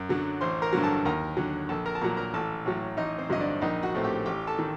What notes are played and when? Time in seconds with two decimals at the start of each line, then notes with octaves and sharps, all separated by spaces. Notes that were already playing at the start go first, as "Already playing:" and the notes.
Already playing: F#2
0.09 D3 F#3
0.41 A1 C5 C6
0.62 A#4 A#5
0.73 G2 D3 F#3
0.83 A4 A5
1.05 D#2 A#4 A#5
1.37 D3 F#3
1.69 A#1 A4 A5
1.85 A#4 A#5
1.95 A5
2.01 A#2 F#3 A#4 A#5
2.17 A#4 A#5
2.34 A1 A4 A5
2.66 A2 F#3
2.97 A1 D#4 D#5
3.18 C4 C5
3.30 G2 D3 F#3 D#5
3.40 D4 D5
3.61 A#1 D#4 D#5
3.83 F#4 F#5
3.94 A2 A3 C4
4.04 G4 G5
4.26 A1 G4 G5
4.47 A4 A5
4.59 D#3